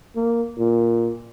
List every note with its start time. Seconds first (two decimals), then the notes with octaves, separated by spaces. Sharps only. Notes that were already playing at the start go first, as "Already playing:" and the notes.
0.16 A#3
0.58 A#2